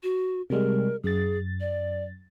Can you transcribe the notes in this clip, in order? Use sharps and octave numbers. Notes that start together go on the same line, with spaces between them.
F#4
C3 G3 G#3 A#4
F#2 G#4 A6
D5